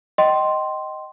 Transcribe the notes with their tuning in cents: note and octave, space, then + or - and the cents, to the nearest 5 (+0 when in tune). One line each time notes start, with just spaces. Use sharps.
D#5 +0 G5 -30 C6 +0